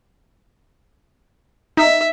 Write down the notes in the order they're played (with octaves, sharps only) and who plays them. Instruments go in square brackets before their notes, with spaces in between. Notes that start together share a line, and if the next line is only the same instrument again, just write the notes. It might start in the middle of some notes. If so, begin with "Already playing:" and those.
[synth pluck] D#4 [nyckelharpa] E5